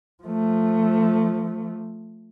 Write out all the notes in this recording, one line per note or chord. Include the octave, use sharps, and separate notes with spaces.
F3 A3